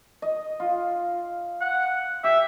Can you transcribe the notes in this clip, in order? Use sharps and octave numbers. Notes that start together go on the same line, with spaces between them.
D#5
F4
F#5
G4 E5